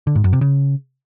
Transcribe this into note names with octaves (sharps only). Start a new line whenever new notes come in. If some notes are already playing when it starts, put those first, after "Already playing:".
D3
G#2
F#2
C3
C#3